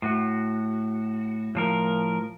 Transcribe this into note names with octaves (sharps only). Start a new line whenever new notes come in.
A2 F#4
A2 F3 A#4